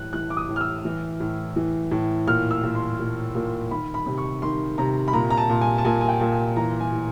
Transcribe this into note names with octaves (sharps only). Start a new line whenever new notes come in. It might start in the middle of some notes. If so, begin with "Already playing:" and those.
Already playing: A2 E3 F#6
E3 F#6
D6
D#6
A2
F6
E6
E3
A2
E3
A2
A#2 F6
E6
A#2
C6
A#2
A#2
D#3 B5
B5
C3
C#6
D#3 C6
C3 A#5
B5
A#2 A#5
A#5
A5
A#2
G#5
A5
A#2 G#5
G#5
G5
A#2
G#5
E3 A#5
G#5
A2